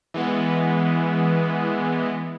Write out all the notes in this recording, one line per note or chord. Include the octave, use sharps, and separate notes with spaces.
E3 G#3 B3